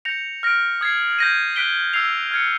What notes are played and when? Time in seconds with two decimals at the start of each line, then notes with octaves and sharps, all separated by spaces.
0.05 G6 A#6 C#7 F7
0.43 F6 A#6 D7
0.81 D#6 G#6 C7
1.19 G6 A#6 D#7
1.56 F#6 B6 D7 G7
1.93 E6 G#6 C7 F7
2.31 F6 G#6 C#7